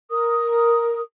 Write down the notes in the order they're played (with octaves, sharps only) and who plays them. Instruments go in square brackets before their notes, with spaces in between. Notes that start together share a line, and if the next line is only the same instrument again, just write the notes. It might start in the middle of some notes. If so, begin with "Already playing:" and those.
[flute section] A#4 D#6